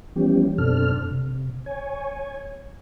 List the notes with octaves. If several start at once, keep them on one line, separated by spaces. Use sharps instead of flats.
E3 F3 G3 B3 C#4 G4
F#2 B2 C4 D4 A4 F6
C3
C#5 G#5